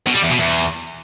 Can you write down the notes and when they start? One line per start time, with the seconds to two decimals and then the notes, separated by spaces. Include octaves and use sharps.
0.06 B2
0.14 G3
0.22 E2
0.30 B2
0.38 E2